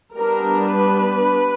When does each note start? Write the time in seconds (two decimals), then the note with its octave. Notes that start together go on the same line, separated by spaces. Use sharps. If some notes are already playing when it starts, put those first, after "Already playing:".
0.16 G3 B3 D4 A#4
0.76 B4